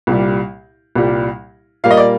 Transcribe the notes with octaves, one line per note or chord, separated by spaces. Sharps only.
C2 A#2 G3
C2 A#2 G3
A#2 G3 A#3 F5
D#5
D5